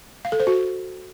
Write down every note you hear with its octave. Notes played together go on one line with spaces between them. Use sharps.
F5
A4
C5
F#4